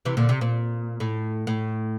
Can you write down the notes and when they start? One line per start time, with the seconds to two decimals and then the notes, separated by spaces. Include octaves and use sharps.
0.05 C3 E3
0.17 A#2 D3
0.29 C3
0.41 A#2
1.00 A2
1.47 A2